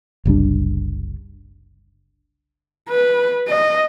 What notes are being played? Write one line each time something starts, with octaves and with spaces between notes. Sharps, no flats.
F#1 C2 G3 D4
B4
D#5